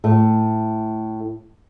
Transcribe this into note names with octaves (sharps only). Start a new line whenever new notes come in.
A2 A3